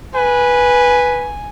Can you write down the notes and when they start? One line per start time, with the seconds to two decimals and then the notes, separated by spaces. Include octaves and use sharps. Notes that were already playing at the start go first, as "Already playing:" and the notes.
0.15 B4 G#5